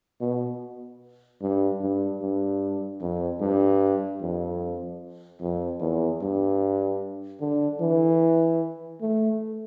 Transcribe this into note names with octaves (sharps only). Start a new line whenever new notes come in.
B2
G2
G2
G2
F2
G2
F2
F2
E2
G2
D3
E3
A3